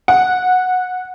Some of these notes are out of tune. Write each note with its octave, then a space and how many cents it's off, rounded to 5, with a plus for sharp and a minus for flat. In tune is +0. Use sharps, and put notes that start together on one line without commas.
F#5 -15